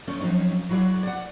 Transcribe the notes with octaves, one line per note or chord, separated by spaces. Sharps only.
D2 A3 C#4 D5
F3 F#3 C4 C#4 D#4
F#3 E4 F#4 G#4 D5
D5 F#5